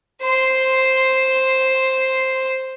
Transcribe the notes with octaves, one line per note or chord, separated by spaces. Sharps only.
C5 C6